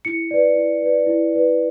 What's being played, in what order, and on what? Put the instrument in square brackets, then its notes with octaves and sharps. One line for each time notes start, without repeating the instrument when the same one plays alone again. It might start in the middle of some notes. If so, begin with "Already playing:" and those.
[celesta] E4 C#7
B4 D5
E4
B4 D5
E4
B4 D5